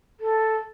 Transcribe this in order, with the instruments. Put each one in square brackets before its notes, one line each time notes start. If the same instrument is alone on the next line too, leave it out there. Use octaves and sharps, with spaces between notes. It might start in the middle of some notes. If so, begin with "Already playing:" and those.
[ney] A4